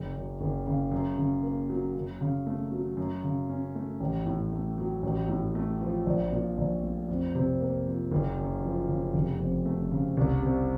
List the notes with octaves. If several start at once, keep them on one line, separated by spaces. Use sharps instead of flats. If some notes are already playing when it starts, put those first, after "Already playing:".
Already playing: F#1
F#2
F#1
C#3
F#2
C#3
A#3
F#3
F#2
C#3
A3
F#3
F#2
C#3
C#4
A3
A1
A2
A3
F#3
A1
A2
A3
F3
A#1
A#2
A#1
A3
F2
C3
A#3
F3
F#1
F#2
F3
C#3
F1
F2
A3
C#3
C2
C3